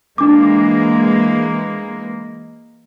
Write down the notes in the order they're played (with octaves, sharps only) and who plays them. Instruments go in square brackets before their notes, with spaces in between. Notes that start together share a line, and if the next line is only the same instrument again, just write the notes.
[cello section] E3 G#3 A#3 [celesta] D4 D6